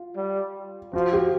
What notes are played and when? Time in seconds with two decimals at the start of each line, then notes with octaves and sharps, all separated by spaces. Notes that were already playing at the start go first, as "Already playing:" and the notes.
Already playing: F4
0.16 G3
0.93 F3 F#4
1.13 G4